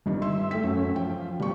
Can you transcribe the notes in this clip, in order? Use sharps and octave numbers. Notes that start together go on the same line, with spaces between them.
G1 G2 D#3
E5 C6
A3 G5 B6
F#2 C#4
F3 G5
G1 F3 G3 C#6